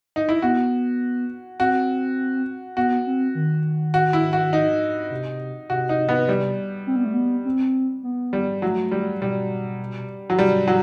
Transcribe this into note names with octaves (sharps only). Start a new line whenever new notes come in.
D#4
E4
B3 F#4
C4 F#4
B3 F#4
C4
D#3
F#4
E4
F#4
D#4
C3
C3 F#4
D#4
B3
G3
C4
B3
A3
B3
C4
B3
G3
F#3 A3
G3
B2 G3
F#3
C3 G3
F#3